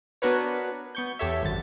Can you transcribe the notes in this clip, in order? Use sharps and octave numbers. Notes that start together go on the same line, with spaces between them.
B3 D4 F#4 A#4 B4 C#5
B3 C#6 G6
E2 G4 A4 C#5 E5
G#1 F#2 D3 A6